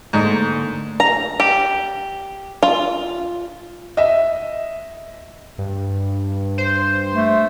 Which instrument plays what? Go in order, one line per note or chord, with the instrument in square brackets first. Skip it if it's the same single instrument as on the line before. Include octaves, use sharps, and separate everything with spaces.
[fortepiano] G#2 [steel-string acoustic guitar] D3 A3 A#3
[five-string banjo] A#5
G4
F4
[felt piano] D#5 E5
[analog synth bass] G2
[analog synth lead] C5
[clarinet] A3